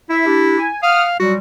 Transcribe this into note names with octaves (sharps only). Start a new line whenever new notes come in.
E4 E5
D4 G4
G#5
F5 F#5 D#6 F6
A#2 F#3 G3 F#4